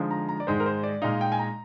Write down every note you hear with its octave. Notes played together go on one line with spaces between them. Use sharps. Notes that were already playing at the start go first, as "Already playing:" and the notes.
Already playing: D3 F3 G#3 D#4
A#5
A#5
D5
G#2 D#3 G#3 D#4 C5
A#4
C5
D5
A#2 G#3 D#4 F5
G5
G#5
A#5